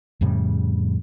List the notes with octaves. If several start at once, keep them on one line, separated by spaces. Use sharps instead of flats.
F2 A2 C#3 G3